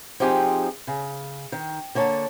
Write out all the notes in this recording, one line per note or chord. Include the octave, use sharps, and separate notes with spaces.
F3 C4 D#4 G4 G#4
C#3
D#3
D3 A#3 C#5 G#5 A5